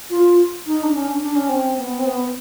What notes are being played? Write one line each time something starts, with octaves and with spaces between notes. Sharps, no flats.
F4
D#4
D4
C#4
D4
D4
C#4
C4
B3
C4
B3